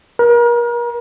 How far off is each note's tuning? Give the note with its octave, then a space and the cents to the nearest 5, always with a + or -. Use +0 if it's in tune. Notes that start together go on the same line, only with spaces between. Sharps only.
A#4 +35